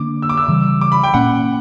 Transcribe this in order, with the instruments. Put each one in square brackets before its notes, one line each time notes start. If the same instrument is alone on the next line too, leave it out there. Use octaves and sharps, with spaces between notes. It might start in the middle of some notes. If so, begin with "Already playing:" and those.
Already playing: [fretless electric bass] D3 A#3 D4 [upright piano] D6
[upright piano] E6
D6
E6
[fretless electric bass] C#3 E3 G3
[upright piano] D6
B5
G5
[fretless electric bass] A#2 A#3 C#4 [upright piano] F#5